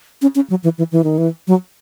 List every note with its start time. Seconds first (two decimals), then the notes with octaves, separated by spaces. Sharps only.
0.22 C#4
0.35 C#4
0.50 F#3
0.64 E3
0.78 E3
0.92 E3
1.04 D#3
1.18 E3
1.47 F#3